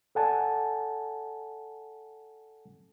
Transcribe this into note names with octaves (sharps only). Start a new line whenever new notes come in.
A4 D5 F#5 G#5 A5